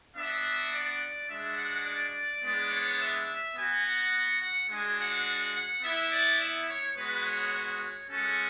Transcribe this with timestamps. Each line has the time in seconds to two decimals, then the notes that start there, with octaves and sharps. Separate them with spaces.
0.16 B3 D4 F#4 E5
0.73 D5
1.30 G#3 D4 F#4 E5
1.58 F#5
1.86 D5
2.42 G#3 B3 D4
2.71 C#5
3.00 E5
3.56 B3 F#4 G#5
3.85 F#5
4.41 F#5
4.70 G#3 D4 F#4 G#5
4.98 F#5
5.55 F#5
5.83 B3 E4 E5
6.12 D5
6.40 E5
6.68 C#5
6.96 G#3 B3 F#4 B4
7.25 C#5
7.53 C#5
8.09 G#3 C#4 F#4 A4